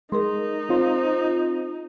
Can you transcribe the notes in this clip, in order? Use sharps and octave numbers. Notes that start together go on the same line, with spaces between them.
G#3 D#4 G#4 A#4 C6
C4 F4 C5